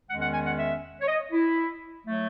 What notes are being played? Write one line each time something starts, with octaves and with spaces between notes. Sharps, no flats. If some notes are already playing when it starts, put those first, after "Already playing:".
E2 D#3 G#3 C#4 F#5
F#5
G#5
F#5
E5
C#5
D#5
E4
F#3 A3